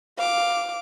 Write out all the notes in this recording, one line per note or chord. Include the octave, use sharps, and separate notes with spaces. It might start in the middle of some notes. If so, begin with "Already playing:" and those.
F5 D6